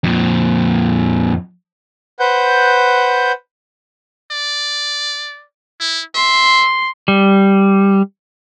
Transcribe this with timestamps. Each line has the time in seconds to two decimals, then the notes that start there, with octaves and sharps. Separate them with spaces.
0.04 F2 A#2
2.20 B4 C5 F#5 G6
4.31 D5
5.81 E4
6.15 E5 C6
7.08 G3